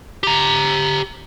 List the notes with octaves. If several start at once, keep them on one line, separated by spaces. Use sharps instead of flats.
G4 A#5